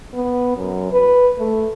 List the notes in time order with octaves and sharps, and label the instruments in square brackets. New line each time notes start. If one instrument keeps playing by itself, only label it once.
[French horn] B3
F#2
B4
A3